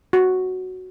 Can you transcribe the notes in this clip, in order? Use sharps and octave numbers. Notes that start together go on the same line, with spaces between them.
F#4